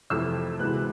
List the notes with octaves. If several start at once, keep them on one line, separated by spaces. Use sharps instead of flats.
F2 C3 E3 A3 E6
D2 C3 E3 G#3 B3 F#6